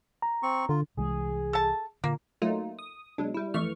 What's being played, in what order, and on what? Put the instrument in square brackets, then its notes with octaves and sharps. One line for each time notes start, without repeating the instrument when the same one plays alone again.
[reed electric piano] A#5
[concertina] C4 C#6
[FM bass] D3 [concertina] F4
[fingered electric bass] C2 E3 G#3 [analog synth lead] G#4
[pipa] A4 A5
[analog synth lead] A#2 [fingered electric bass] D3 [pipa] A#3
[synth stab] F#3 A3 A#3 D#4 F4
D#6
B2 F#3 G#3 D4
G3 E4
F2 E3 A3 C#6 F6